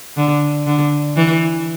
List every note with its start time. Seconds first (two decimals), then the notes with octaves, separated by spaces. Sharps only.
0.17 D3
0.67 D3
1.17 E3